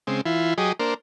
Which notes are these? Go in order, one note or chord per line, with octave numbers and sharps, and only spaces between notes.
C#3 G#3 C4
E3 E4 F4
F#3 G4 G#4 D#5
A#3 D4 A#4 C5